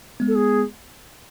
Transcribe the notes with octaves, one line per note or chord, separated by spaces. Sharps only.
G#3 B3
A4
G#4